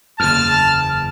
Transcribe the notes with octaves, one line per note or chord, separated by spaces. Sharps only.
F#1 E2 A5 F6